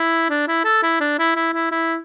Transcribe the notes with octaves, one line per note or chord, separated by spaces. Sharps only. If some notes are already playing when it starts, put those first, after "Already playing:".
Already playing: E4
D4
E4
A4
E4
D4
E4
E4
E4
E4